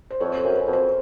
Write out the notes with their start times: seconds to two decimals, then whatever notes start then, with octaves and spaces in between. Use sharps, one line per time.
0.10 C5
0.20 F2 C#5
0.38 C5
0.44 F#2
0.56 B4
0.67 F2
0.73 C5